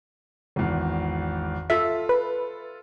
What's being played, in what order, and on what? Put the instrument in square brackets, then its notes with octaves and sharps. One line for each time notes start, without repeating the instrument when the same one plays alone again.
[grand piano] G#1 E2
[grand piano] F4 A4 [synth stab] E5
[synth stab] B4